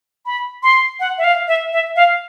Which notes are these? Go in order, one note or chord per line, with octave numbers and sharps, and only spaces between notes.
B5
C6
F#5
E5
F5
E5
E5
F5